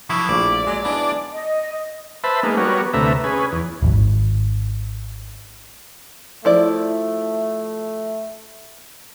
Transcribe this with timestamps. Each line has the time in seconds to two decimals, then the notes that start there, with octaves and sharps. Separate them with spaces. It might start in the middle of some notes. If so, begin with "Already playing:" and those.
0.10 F3 F#3 E4
0.29 A#1 A2 D5 F5
0.67 F#3 G#3 D#5
0.84 G#3 B3 D4 E4
1.33 D#5
2.24 B4 C5 E5 A5 B5
2.43 G#3 A#3 B3 D#4
2.57 G3 B3 F#4 A#4 C#5
2.93 D2 C3 A3 B4 E5 A#5
3.24 C#4 G#4 B4
3.52 E2
3.82 D#1 G#1
6.45 F3 A3 E4 D5